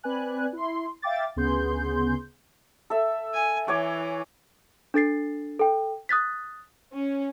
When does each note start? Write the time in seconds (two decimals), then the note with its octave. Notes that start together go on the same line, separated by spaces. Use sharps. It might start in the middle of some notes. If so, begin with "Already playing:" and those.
0.03 C4 B4 D5 G#5 F#6
0.53 E4 C6
1.02 E5 F5 G5 D6 A6
1.36 D2 C#3 B3 G#4 C6 G6
2.90 A4 E5
3.34 G#5
3.68 E3 C#5 G#5 D6
4.94 D4 A4 A6 C7
5.60 A4 G5
6.09 D#6 F#6 A6 B6
6.93 C#4